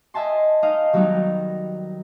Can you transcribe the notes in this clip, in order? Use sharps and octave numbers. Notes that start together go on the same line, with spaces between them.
D#5 E5 G#5 A5 C6
D#4 D#5 F5
D#3 F#3 G3 B3 D#4